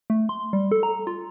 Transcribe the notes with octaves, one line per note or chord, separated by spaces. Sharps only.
A3
C6
G3
A4
A#5
F4